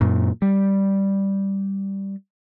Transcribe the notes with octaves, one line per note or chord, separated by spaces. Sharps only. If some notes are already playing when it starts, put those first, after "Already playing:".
F#2 A#2
G3